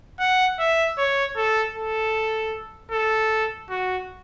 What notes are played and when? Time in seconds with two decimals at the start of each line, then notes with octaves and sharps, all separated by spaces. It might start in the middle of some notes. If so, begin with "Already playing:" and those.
0.20 F#5
0.59 E5
0.98 C#5
1.37 A4
1.75 A4
2.92 A4
3.70 F#4